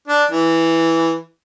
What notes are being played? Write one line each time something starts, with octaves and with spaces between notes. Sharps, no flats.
D4
E3